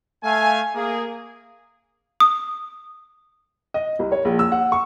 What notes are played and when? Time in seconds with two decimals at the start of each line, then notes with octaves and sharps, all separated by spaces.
0.24 A3 F5 G#5
0.75 A#3 G#4
2.20 D#6
3.74 D#5
3.99 C2
4.12 C#5
4.25 A#1
4.39 E6
4.52 F#5
4.72 C#6